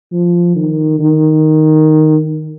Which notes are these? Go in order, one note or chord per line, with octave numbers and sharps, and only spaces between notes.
F3
D#3
D#3